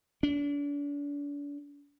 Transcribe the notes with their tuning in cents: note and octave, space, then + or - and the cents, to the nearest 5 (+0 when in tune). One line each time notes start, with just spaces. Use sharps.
D4 -40